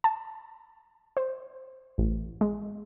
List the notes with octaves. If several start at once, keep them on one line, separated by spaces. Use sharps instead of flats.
A5
C5
A1
G#3